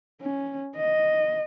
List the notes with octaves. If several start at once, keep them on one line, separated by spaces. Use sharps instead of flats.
C#4
D#5